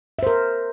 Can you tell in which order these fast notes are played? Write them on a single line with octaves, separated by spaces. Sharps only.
E5 C5 A#4